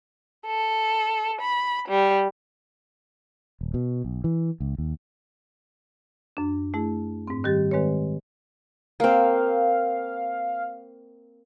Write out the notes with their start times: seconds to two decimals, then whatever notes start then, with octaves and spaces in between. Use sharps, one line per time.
0.48 A4
1.41 B5
1.88 G3
3.61 D#1
3.74 B2
4.04 B1
4.24 E3
4.60 C#2
4.78 D#2
6.37 F#2 D4
6.74 A3 E4 G#4
7.27 G#2 C4
7.44 D#3 G3 G4 A6
7.71 D#3 G#3 C4 B4 C#5
9.00 A#3 C4 F5